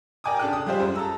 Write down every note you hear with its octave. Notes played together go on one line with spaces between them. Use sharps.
A#4 D5 G5 G#5 D6 D#6
C#3 D4 A4 G5 F#6
D#6
G3 G#3 F4 G4 G#4 C5
F#2
A4 A#5 E6